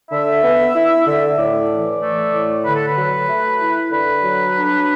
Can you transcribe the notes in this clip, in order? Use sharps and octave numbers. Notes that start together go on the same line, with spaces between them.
D3 E5
B3
E4
D3
A2 D5
E3
A3
A2
D3 B4
A4
B4
F#3
A3
E4
D3 B4
F#3
D4